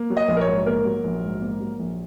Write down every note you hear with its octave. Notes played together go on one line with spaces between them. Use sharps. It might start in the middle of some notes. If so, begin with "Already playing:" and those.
Already playing: A#3
F#3
D#5
A#1
A#4
C#5
G#2
A#3 A#4
F#3
A#1
G#2
A#3
F#3
A#1